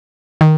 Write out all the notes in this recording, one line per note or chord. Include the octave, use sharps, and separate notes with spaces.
D#3